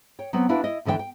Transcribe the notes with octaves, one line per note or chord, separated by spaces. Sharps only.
C#5 G5
F#3 B3 C4 B4
A#3 D4 E4 F#4 B4
E4 D#5
E2 D3 E3 D5 G5
G5